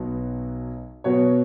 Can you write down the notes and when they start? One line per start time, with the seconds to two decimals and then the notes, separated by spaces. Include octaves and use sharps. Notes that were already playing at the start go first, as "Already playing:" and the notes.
Already playing: B1 B2 F#3 B3 F#4
1.04 B2 F#3 B3 F#4 C#5